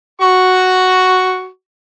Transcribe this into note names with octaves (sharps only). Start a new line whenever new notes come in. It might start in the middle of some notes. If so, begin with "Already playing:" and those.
F#4 C#6